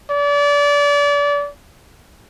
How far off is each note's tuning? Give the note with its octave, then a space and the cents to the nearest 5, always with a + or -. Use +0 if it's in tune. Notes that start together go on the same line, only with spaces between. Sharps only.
D5 -30